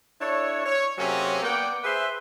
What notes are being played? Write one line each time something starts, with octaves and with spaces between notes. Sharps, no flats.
D4 E4 A4 C#5
C#5
C3 F#3 A#3 C4 C#4 G#4
A#3 B3 D5 F#5 G5
G#4 B4 C5 E5